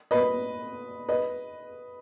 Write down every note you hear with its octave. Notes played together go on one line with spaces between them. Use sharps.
B4 D#5
B4 D#5